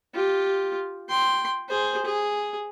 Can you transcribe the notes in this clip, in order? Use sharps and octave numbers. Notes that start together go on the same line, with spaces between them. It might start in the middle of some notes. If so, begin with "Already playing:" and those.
F4 G4
G5 C6
G#4 C5
G#4